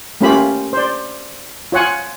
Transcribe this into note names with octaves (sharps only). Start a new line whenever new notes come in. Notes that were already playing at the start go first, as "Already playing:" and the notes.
A3 A#3 C#4 F4 G4 B5
C5 D5
F4 C#5 F#5 G#5